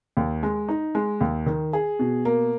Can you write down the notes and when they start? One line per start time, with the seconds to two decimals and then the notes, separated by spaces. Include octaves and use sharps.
0.17 D#2
0.43 G#3
0.69 D#4
0.95 G#3
1.21 D#2
1.46 D#3
1.73 G#4
1.99 B2
2.25 A#3